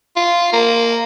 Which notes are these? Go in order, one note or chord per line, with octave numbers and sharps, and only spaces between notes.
F4
A#3